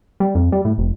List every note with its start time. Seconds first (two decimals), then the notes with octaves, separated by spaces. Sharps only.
0.20 G3
0.35 F2
0.52 G3
0.65 A2
0.78 F1